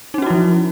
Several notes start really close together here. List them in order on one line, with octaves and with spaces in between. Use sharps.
D#4 C#4 F#4 E4 F3